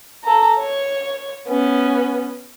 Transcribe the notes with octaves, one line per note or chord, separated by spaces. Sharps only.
A4 A#5
C#5
B3 C#4